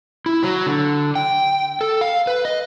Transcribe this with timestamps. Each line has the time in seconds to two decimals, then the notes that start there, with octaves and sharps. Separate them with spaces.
0.26 E4
0.43 F#3
0.66 D3
1.15 G5
1.81 A4
2.01 F5
2.27 B4
2.45 D#5